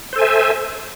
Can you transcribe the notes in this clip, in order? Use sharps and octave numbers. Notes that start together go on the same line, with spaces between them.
A4 C5 E5 G#5